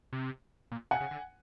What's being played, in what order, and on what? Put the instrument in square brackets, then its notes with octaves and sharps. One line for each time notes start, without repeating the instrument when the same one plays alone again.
[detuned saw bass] C3
A#2
[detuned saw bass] C3 [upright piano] F#5 G#5
[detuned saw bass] C#3
D3